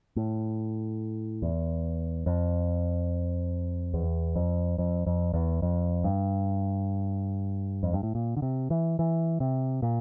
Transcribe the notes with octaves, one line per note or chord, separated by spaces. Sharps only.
A2
E2
F2
E2
F2
F2
F2
E2
F2
G2
F2
G2
A2
A#2
D3
C3
E3
E3
C3
A#2